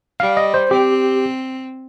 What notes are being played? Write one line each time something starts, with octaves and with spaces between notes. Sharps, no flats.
G3 F5
D#5
C5
C4 G4